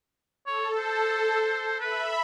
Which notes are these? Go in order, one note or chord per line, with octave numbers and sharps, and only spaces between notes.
A4 C#5
C5
B4 E5 B5